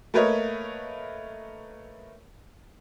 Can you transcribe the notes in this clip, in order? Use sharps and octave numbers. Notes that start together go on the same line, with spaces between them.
A3 A#3 A#4 B4 C#5 D#5